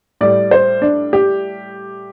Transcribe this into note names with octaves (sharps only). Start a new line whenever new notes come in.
A2 G3 D5
C5
D4
G4